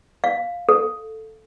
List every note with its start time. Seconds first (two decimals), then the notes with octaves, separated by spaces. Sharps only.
0.24 F5
0.69 A4